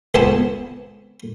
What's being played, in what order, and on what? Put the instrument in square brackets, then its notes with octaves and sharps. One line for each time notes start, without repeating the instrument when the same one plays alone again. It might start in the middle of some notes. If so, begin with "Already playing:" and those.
[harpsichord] C#2 B3 C4 C5 G#5 A5